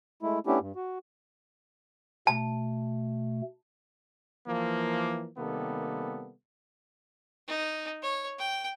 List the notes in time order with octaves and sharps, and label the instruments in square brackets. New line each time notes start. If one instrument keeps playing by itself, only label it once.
[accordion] G#3 A3 E4
A3 B3 C#4 D4 E4 G4
G2
F#4
[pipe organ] B2 A3 [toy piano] A5
[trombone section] E3 F3 A#3
C3 D#3 G3 A#3 B3 A4
[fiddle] D#4
C#5
G5